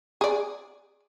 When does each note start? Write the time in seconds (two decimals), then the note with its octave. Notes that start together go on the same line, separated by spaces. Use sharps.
0.21 G#4 D5